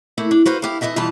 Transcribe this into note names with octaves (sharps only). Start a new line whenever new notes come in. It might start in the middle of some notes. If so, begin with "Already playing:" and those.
A3 A#3 E4
D4
F#4 B4 C5 F5
E4 G4 F5
E3 F#3 D#5 E5 A5
F2 B2 E3 G3 F4 A5